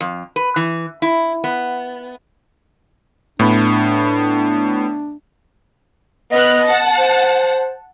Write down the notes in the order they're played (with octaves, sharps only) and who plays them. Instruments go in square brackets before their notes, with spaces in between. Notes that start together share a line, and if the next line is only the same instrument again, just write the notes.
[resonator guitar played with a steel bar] F2
B4
E3
E4
B3
[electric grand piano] A2 B3 B5 [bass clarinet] D4
[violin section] B3 F6 F#6 [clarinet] D#5
[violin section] F#5 A5
[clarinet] C5